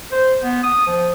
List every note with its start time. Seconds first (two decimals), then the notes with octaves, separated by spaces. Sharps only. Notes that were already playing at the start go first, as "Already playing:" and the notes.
0.12 C5
0.43 B3
0.63 D#6
0.87 F3